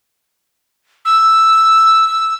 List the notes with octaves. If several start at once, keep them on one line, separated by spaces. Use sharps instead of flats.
E6